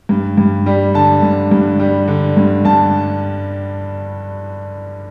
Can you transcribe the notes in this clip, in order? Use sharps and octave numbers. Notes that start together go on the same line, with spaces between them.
G2
G2
G3
D3 A5
G2
G2
G3
D3
G2
G2 A5